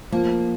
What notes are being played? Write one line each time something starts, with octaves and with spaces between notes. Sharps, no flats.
F3 A#3